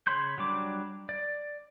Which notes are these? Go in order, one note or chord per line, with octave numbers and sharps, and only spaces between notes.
C#3 C#5 B5 C6 G6
F#3 G3 D4 D6
D5